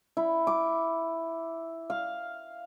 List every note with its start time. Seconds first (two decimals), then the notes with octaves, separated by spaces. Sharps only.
0.17 E4
0.47 D6
1.90 F5